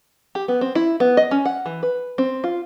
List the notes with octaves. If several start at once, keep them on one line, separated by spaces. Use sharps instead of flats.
G4
B3
C4
E4
B3
D#5
C#4
F#5
E3
B4
C4
F4